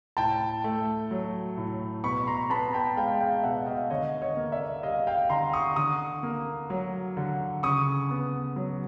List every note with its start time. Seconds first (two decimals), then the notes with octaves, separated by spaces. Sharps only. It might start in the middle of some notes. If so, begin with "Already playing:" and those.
0.17 A2 G5 A5
0.64 A3
1.11 F#3
1.58 A2
2.04 B2 B5 C#6
2.27 A#5 C6
2.50 B3 A5 B5
2.73 G5 A5
2.97 G#3 F5 G5
3.21 F5 G5
3.43 B2 E5 F#5
3.66 D#5 F5
3.90 D3 C#5 D#5
4.22 C#5 D#5
4.37 A#3
4.52 D5 E5
4.83 G3 D#5 F5
5.07 F5 G5
5.30 D3 A#5 C6
5.53 C#6 D#6
5.76 D3 C#6 D#6
6.23 A#3
6.70 F#3
7.17 D3
7.63 C#3 C#6 D#6
8.11 B3
8.56 F#3